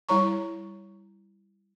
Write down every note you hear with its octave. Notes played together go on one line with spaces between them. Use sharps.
G3 E4 C#5 A#5 C#6